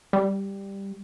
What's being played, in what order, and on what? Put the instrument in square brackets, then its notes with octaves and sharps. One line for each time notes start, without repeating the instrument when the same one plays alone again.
[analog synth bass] G3